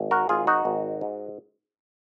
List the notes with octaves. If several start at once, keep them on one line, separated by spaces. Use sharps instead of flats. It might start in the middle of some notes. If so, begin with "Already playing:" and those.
Already playing: G#1
F#4 A#4
G#1 F4 G#4
D#4 F#4
G#1
G#2